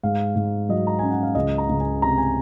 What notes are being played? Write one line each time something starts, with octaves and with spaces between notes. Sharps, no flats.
G#2 F5
G#2
F#3 D#5
A#5
C#4 G#5
F#5
F5
C#2 D#5
A#5
C#2
G#5
C3 A#5
G#5